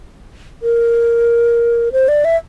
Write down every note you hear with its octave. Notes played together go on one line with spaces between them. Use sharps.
A#4
C5
D5
E5